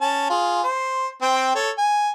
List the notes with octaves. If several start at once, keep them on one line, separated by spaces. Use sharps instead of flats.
C#4 A5
F4 G#4
C5
C4 G5
A4 C#5
G#5